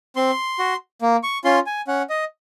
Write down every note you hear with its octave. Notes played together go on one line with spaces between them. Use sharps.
C4 C6
F#4
A#3
C#6
C#4 F4 C6
G#5
C#4 F#5
D#5